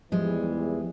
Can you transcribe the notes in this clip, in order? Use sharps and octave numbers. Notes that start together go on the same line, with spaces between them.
E2 E3 F3 G3 G#3